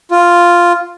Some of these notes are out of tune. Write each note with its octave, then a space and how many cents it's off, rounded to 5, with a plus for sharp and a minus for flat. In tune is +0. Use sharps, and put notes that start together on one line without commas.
F4 +0